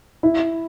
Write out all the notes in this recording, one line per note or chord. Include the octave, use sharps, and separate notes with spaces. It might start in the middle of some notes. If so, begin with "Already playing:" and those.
E4